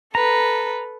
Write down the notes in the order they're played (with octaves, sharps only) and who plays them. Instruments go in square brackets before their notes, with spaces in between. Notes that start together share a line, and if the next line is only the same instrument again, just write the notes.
[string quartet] A4 B4 [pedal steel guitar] A#5